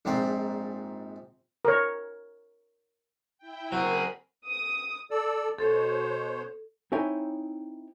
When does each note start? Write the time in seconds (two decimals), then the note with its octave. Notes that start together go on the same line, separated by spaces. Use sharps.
0.05 A#1 G#2 C4 D5
1.65 A#4 C#5
3.38 E4 G5
3.72 F#3 C4 F#4 G#4 A#4 B5
4.46 D#6
5.11 A4 D5 E6
5.59 B2 A4 C5 C#5
6.92 C4 D#4 E4 C#5 G5 G#5